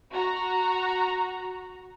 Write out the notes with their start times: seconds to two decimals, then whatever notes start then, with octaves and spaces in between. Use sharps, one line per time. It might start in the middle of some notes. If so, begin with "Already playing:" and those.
0.12 F#4 A#5